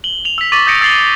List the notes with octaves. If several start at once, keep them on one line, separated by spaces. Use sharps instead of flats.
F#7 G7
F7 F#7
E6 B6
C#6 D6 A6 B6 D#7 F#7
D#6 G6 A#6 C#7 D7
E6 A6 C7 F#7 G7